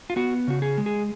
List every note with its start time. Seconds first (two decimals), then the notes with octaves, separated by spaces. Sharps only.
0.10 F4
0.16 B3 F#4
0.48 C#3 F#4
0.62 G#4
0.78 G#3
0.86 G#4